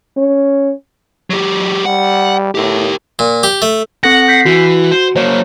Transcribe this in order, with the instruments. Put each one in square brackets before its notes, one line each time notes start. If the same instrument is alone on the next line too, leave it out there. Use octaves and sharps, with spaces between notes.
[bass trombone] C#4
[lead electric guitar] F#3 G4
[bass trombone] G3 [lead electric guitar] F#5
[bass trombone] A2 [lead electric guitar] G4 A#4
[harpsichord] A#2
G4
A3
[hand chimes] C4 A4 A#6 [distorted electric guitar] F#5
[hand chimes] G6 B6 C7
[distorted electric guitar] E3 [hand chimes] F#4
[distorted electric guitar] C5
[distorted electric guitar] F#3 A#3 [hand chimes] C5 C#5